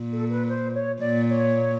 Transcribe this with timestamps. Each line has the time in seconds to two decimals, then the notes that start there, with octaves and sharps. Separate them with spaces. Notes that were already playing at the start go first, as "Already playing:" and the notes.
Already playing: A#2
0.12 A4
0.30 B4
0.48 C5
0.74 C#5
1.01 A#2 D5
1.29 C#5